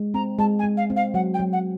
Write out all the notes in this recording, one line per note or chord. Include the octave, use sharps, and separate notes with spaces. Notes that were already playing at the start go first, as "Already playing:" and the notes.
Already playing: G#3
C4 A#5
G#3 A5
G#5
G#3
F5
C4
F5
F#3 F#5
G5
F#3
F#5